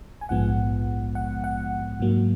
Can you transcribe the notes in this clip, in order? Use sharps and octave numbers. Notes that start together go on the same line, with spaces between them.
G#5
A#1 G#2 F3 G#3 B3 F#5
F#5
F#5
G#2 F#3 A#3